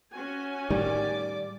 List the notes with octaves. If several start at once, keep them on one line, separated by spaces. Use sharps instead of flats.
C#4 F#4 G#5
A2 D#3 G3 D5 D6